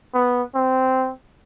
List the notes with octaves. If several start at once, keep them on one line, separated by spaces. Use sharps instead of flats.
B3
C4